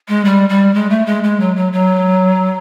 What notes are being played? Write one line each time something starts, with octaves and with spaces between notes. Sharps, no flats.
G#3
G3
G3
G#3
A3
G#3
G#3
F#3
F#3
F#3